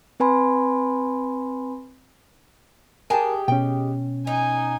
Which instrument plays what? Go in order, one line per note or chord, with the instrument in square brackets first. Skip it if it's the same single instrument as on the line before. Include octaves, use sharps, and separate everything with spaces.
[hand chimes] C4 B4 G#5 B5 C6
[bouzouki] G#3 G4 [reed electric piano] A#4 [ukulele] G#5 A5
[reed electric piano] B2 C#4 [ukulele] G5
[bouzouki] D#4 [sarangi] G#5